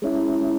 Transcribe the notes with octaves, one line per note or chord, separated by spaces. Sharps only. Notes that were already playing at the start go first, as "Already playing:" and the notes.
G#3 C#4 E4